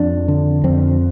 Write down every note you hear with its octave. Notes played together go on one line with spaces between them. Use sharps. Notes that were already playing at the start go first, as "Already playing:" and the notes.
Already playing: F2 D4
D3
F2 C4